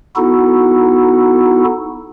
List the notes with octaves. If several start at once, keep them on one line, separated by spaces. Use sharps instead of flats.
B3 D#4 E4 F#4 A4